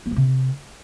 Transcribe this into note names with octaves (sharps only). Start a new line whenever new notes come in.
A#3
G#3
C3